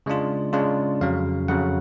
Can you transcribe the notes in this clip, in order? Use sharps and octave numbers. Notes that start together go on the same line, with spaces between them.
C#3 G#3 D4 F4
C#3 G#3 D4 F4
F2 C#3 F#3 F5
F2 C#3 F#3 F#5